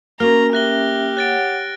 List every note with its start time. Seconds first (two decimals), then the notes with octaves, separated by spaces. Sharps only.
0.20 A#3 C#4 F#4 A#5 F6
0.53 C#4 G4 E5 F#6 A#6 G7
1.17 C#5 F#5 F#6 A6 D7